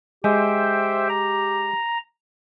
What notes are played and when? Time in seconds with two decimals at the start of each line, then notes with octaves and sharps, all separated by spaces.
0.24 G#3 G4 C5 E5 G5
1.09 A#5